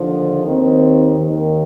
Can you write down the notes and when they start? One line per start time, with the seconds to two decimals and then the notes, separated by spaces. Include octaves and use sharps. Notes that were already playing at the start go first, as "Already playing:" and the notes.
Already playing: D#2 D3 F3
0.46 D#2 D#3 C4
1.19 D#2 D#3